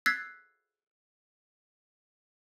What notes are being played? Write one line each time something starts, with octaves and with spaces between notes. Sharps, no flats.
E6 F#6 G#6 A6 B6 C7